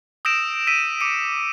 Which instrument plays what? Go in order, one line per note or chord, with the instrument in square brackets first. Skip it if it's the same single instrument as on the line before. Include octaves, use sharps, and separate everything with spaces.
[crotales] D#6 E6 G6 A#6 D7 E7
E6 B6 D#7
D6 C#7 D#7